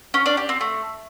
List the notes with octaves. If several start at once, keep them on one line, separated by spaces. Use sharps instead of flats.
C#4
D4
G4
C4
A3